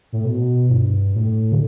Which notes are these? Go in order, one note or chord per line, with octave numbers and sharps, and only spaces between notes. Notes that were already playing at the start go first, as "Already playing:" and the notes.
A2
B2
G2
A2
D3